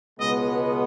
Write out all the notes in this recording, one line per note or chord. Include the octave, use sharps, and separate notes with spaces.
C#2 B2 G#3 B3 D#5